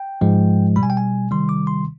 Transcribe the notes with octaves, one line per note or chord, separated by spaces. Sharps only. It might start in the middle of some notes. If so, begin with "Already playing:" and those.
Already playing: G5
G#2 F3 G#3
B2 G3 B5
G#5
G5
G#5
C3 D#3 G3 C6
D6
C6